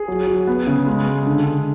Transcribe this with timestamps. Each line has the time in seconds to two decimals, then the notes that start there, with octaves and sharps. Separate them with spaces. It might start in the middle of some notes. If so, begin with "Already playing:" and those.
Already playing: G#4
0.08 F#3
0.27 F#3
0.47 B3
0.67 C#3
0.86 G#3
1.06 G#3
1.26 D3
1.46 D3